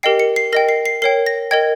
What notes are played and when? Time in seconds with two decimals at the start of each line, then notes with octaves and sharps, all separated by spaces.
0.03 G4 A#4 D#5 G5 C7
0.20 C#7
0.36 C7
0.53 A#4 D#5 G5 A#6
0.69 C7
0.86 C7
1.02 A#4 C#5 G5 C7
1.26 A#6
1.51 A#4 D#5 G5 G#6